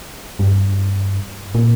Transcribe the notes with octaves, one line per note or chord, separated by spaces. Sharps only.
G2
A#2